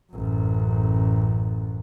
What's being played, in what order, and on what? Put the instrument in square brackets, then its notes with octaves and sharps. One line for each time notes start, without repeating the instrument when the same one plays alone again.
[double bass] A1 F#2